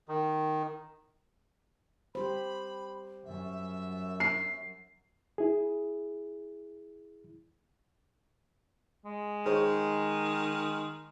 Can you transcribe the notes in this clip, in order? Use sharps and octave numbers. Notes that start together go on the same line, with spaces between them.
D#3
G3 G4 C5 B5
F#2 E5
C7
E4 G#4
G#3
D#3 G#4 C5 C#5